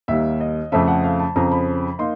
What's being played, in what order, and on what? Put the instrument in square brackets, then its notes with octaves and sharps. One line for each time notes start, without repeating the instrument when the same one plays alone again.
[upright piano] D#2 D#3 G3 A#3 E5
D#5
F2 C#3 F3 A3 C4 E5
F#5
F5
A5
F2 C#3 F3 A#5
B5
A#3 D#4 C6